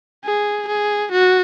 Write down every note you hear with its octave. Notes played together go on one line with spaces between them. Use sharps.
G#4
G#4
F#4